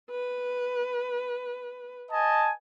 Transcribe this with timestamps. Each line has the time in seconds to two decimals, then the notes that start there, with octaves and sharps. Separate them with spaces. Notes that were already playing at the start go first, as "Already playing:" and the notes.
0.11 B4
2.11 D#5 G#5 A5